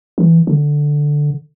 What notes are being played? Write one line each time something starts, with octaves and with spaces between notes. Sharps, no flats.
E3
D3